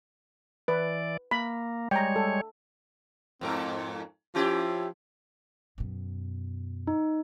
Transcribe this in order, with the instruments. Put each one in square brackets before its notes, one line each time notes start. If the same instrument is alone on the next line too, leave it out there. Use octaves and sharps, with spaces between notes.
[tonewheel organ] E3 D5 [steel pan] B4
[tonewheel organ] A#3 [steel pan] B5
[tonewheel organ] G3 G#3 C#5 [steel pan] G5 A#5
[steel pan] A4
[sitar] F2 G#2 A#4 [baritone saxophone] C4
[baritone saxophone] F3 [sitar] C#4 E4 G4
[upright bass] F#2 B2
[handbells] D#4